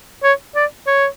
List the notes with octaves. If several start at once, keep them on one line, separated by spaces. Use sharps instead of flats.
C#5
D5
C#5